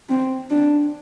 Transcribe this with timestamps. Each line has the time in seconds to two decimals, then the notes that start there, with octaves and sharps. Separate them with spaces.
0.09 C4
0.50 D4